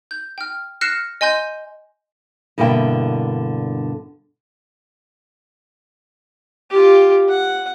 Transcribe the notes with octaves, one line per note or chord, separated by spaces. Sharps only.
G6
G5 F6
F6 F#6 A#6 C7 C#7 E7
D#5 G#5 C6 G6
G2 B2 D3 A#3 E4 G5
F4 G4
F#5